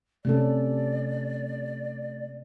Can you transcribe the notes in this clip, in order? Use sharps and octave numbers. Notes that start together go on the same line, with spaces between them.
C3 A3 C#4 A4 D5